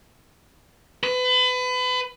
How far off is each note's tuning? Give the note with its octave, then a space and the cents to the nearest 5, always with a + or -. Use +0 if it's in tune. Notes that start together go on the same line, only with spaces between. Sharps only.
B4 +30